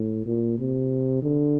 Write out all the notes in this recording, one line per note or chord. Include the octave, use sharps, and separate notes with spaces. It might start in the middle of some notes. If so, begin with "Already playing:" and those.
Already playing: A2
A#2
C3
D3